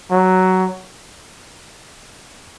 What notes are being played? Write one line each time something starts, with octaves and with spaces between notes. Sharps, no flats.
F#3